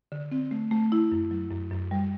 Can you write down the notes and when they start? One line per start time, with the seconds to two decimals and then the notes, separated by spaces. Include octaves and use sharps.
0.12 D3
0.32 C4
0.51 A3
0.71 A3
0.92 E4
1.12 F#2
1.31 F#3
1.51 F#2
1.71 F#2
1.91 G3